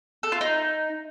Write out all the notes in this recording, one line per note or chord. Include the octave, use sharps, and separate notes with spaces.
A4
F4
D#4